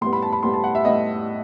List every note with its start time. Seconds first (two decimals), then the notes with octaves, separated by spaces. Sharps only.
0.01 A2 G3 B3 C6
0.13 B5
0.22 A5
0.33 B5
0.43 A2 G3 B3 C6
0.54 A5
0.64 F#5
0.75 E5
0.84 A2 G3 B3 D#5